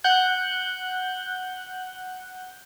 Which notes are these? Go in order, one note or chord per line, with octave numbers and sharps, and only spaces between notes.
F#5 F#6 G6